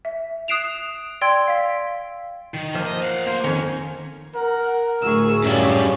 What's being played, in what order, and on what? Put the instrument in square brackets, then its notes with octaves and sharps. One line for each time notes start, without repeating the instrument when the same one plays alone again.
[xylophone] E5
D#6 F#6 C7 D7 E7 F7
D5 G5 C6 E6 G#6 D7
F5 B6
[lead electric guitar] D#3
[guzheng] F3 A#3 E5
[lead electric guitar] D#5
F5 F#5
[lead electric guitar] A#3 [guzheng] C5
[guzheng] F2 D#3 [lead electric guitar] C#4
[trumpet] A#4 [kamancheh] F#5
[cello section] D2 A2 G#4 [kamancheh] C#6 E6
[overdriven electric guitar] F#2 G3 [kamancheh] F4 C#5